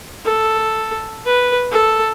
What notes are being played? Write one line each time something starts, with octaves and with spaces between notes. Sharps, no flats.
A4
B4
A4